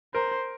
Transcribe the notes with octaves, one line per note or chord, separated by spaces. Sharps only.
A#4 C5